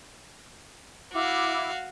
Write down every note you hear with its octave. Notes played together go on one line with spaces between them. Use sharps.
E4 F#4 F5 D6